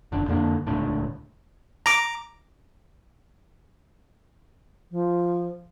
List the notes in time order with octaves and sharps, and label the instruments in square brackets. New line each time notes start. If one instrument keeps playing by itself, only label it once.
[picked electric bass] F1 D3
F2 D3 A#3 D4
D#1 C#2 A2 D3
[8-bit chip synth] A#5 D6
[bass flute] F3